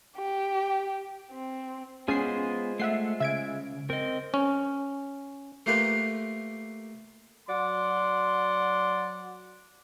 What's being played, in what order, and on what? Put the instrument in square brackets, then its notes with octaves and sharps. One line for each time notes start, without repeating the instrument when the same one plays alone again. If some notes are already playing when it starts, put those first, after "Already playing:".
[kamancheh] G4
C4
[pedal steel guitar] G#3 F4 C5 [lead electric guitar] B3 G#4 [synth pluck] C#4 G#5 C7
[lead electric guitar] A3 [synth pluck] E5 F#5 C7
[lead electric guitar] C#3 [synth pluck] E5 G#6 D7
[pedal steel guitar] C4 [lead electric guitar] A#4 D#5
[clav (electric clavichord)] C#4
[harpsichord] A3 A#3 F4 G4 B4
[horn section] F#3 D5 F#5 C6